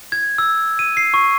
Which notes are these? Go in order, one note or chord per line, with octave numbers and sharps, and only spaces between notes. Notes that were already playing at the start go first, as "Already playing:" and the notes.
G#6
E6
D#7
C7
C#6